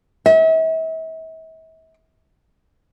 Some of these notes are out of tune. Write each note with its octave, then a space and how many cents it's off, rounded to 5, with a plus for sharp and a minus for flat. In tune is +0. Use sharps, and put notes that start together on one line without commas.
E5 -40